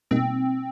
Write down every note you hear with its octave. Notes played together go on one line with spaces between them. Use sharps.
B2 G3 A#3 C4 D#4